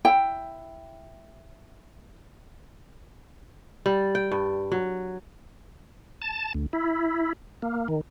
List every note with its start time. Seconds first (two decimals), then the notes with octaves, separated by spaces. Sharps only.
0.05 E4 G5
3.86 G3
4.15 G5
4.32 G2
4.72 F#3
6.22 A5
6.54 D2
6.73 E4
7.62 A#3
7.88 D#3